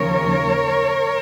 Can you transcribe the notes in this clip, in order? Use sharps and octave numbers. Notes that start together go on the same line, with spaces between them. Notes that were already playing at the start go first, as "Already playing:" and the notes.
Already playing: D#2 C#3 F3 A#4 C#5